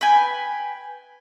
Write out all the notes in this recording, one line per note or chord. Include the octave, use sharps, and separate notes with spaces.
B4 G5 G#5